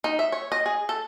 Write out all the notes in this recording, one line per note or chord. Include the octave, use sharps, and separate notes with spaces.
D#4
E5
C#5
D#5
G#4
A4